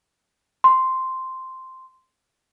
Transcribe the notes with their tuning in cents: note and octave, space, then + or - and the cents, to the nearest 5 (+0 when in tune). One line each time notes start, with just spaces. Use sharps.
C6 -5